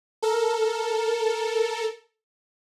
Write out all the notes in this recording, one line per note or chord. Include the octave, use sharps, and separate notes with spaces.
A4 A#4